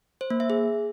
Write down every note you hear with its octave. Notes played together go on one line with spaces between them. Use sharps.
C5
A#3
E5
G#4